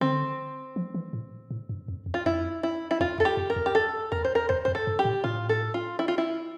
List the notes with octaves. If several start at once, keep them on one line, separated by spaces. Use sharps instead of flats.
D3 C4
F3
E3
A2
A2
G2
F2
E2
F4
F2 E4
E4
E4
E2 F4
E2 A4
G4
F2
A#4
E2
G4
A4
E2 A#4
C5
A#4
E2 C5
F2 C5
A4
G2
G4
A2
A2 F4
A4
F4
E4
F4
E4